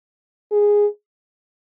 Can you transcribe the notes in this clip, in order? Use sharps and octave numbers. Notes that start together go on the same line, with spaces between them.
G#4